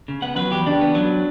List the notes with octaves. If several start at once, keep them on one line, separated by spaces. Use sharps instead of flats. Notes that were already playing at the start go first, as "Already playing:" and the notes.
C#3
B3 F#5
F#3 B4
E2 G4
C#3 D4
B3
F#3